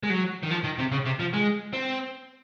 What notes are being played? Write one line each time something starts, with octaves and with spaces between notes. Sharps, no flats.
G#3
F#3
D#3
F3
D#3
C3
C#3
C3
F3
G#3
C4